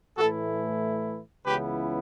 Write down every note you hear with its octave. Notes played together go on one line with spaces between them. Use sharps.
A2 E3 A3 E4 F#4 A4
C#2 C#3 E3 B3 E4 G4 B4